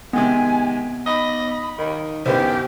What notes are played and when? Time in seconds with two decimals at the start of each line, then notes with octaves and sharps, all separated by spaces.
0.13 C3 D#3 G#3 B3 G#5
1.06 D#4 D#5 B5
1.79 D#3
2.26 C2 F#2 D#3 B3 G4 C5